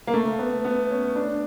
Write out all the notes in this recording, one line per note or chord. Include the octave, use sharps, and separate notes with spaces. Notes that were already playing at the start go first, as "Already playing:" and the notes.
A#3
A3
B3
B3
C#4
D4